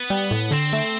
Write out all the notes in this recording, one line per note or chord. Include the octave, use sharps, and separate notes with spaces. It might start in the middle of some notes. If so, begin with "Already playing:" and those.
Already playing: B3
G3
A2
D3 C4
A3